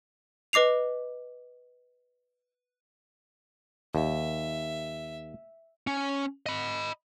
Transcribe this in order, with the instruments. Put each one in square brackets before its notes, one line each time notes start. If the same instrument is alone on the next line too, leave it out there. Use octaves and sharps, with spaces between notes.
[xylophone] B4 D#5 D6 C7 F7
[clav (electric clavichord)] D#2 [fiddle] E5
[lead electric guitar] C#4
D#5 B5